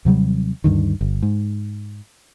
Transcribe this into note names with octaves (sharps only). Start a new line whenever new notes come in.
D#2 C3 F#3 G3
D2 G2 D3 D#3
G1
G#2